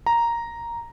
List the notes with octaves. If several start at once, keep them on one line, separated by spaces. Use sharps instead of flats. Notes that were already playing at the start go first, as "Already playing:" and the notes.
A#5